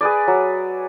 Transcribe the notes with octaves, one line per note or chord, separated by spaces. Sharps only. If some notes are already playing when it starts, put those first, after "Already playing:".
G#4 B4 D5
F#3